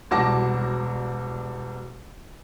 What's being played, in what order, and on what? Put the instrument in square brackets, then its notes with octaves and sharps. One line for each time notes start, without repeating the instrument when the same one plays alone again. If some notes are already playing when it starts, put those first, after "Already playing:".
[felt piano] E1 C2 F#4 A5 D6 A#6